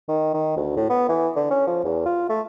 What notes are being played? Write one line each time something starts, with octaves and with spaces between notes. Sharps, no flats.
D#3
D#3
D2
A2
B3
E3
D3
C#4
F3
E2
F4
A3